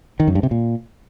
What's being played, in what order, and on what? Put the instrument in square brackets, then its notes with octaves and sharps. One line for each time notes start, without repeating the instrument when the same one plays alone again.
[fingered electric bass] D#3
F#2
G2
C3
A#2